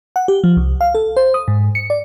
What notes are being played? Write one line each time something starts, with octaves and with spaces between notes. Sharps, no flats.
F#5
G4
F3
C2
F5
A4
C5
D#6
G#2
C#7
D5